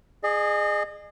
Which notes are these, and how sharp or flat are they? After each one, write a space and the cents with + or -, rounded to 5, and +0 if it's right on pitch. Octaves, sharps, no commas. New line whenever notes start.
G#4 +0 D#5 -40